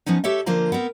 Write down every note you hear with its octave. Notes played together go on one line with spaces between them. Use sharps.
F3 B3 C#4 D#4
G4 A4 C#5 E5
D3 F3 A#3 F4 C5 A#5
B3 C4 A#4